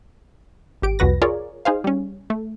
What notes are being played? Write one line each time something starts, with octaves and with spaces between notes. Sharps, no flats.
G#1 G4 D7
C2 F2 F#4 B4 A#6
F4 G#4 A#4 C#5 D5
D#4 G#4 C5 F5
G3 C#4
A3